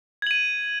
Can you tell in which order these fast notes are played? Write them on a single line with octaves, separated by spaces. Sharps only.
G#6 F#7 D#7